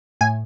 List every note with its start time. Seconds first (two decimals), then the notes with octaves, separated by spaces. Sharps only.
0.21 A2 G#5